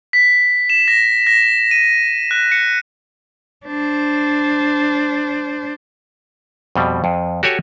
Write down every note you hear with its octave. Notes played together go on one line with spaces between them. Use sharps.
B6
E7
A#6
A#6
D#7
F#6
C#7
D4 C5
F2 B2 G3
F2
F#4 G4 A4 C#5 F#5 G#5